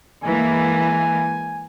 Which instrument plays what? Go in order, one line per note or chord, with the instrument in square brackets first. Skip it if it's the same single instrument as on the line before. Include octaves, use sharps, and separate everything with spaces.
[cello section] E3 G#3 A#3 [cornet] G#5